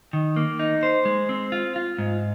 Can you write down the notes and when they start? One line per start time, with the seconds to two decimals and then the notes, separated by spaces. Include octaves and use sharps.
0.13 D#3
0.36 A#3
0.59 D#4
0.83 C5
1.05 G#3
1.29 C4
1.52 F4
1.76 F4
1.99 G#2